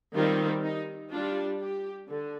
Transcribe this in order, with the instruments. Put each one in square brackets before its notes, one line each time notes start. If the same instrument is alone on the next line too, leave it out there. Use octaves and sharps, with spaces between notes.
[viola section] D#3 G3 C4 F4
D#4
G3 D4 F4
G4
D3